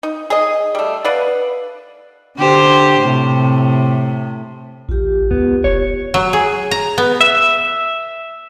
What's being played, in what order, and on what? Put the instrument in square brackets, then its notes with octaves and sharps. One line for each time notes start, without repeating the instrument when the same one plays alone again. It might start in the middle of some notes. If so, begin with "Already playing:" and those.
[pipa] D#4
G#4 D#5
G3 A3
B4 D5 F5 F#5
[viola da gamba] D3 G4 C5
A2 C3
[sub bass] A1 [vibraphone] F4 G4
[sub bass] C#2 [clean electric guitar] B3
[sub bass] F1 [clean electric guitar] C#5
[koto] F#3
G#4
A#5
B3
[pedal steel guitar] E5